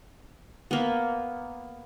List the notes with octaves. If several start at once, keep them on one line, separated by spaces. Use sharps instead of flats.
A#3 B3